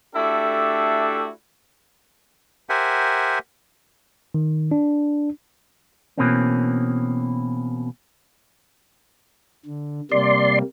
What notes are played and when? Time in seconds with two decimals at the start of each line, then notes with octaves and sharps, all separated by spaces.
0.16 A3 D4 E4 F#4 G4 A4
2.69 G4 A#4 C5 E5 F#5 G#5
4.34 D#3
4.71 D4
6.18 B2 E3 A#3 C4 C#4
9.66 D3
10.11 C3 G3 A#3 D5 C6